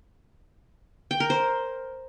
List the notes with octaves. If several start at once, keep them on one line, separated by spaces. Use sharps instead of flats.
G5
A#4
C5